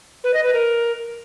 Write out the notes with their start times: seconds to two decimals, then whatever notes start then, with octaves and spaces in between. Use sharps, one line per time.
0.24 B4
0.34 D#5
0.44 B4
0.53 A#4